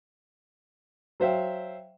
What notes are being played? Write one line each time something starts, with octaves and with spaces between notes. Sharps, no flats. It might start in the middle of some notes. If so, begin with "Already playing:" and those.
F#3 C5 E5 F5 G5